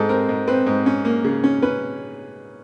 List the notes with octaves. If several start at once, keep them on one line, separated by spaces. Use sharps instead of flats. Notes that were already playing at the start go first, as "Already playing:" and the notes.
Already playing: G#2 G#3 G#4 A4
C4 A#4
G#2
C4 B4
G#2
C#4
A#3
C#3
C#4
C#4 B4